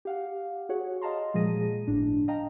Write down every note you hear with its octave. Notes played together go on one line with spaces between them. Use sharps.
G4 F5 F#5
F#4 G#4 C#5 F#5
D#5 F5 A5 A#5 C6
A#2 F3 G#3 G#4 A#6 D#7
G1 A2 D4
D#5 F5 G5 A5 A#5